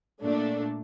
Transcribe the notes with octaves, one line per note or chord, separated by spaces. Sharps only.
A#2 A3 D4